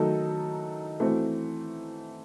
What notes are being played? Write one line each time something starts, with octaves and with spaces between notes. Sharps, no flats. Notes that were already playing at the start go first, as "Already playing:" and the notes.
Already playing: D#3 F#3 A3 D#4 A4
E3 A3 C4 F#4